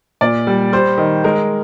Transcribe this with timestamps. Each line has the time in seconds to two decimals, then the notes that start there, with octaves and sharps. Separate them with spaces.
0.21 A#2 D5
0.47 G3
0.73 G3 C5
0.98 D#3
1.24 G#3 A#4